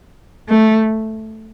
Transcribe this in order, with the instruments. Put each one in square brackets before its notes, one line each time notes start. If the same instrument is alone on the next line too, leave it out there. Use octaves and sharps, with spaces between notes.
[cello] A3